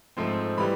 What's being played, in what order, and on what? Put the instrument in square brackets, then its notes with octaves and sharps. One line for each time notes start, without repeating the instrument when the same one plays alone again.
[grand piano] G#2 F3 A3 C4
E3 G3 B5